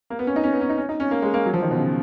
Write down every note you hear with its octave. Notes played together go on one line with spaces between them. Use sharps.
A#3
B3
C#4
D#4
C#4
B3
C#4
D#4
C#4
D#4
C#4
A#3
G#3
A#3
F#3
F3
D#3
B2
C#3